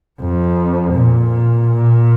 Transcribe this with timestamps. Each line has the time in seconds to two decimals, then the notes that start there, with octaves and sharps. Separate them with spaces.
0.21 F2
0.94 A#2